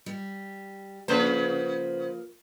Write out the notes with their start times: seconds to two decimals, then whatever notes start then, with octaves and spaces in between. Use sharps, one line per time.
0.06 G3
1.08 C#3 F3 A#3 B4 C5